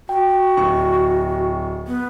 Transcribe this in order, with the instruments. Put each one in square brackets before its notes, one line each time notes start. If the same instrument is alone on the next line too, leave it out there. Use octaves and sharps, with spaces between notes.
[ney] F#4 [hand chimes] G5
[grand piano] D1 C#6
[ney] B3